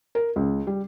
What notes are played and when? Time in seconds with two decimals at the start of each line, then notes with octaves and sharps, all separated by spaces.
0.15 A#4
0.36 C#2
0.67 G3